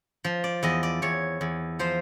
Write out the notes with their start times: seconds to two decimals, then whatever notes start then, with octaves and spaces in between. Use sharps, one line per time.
0.24 F3
0.44 D5
0.63 E2 D#5
0.83 D5
1.02 E2 C#5
1.41 E2
1.79 F3 C5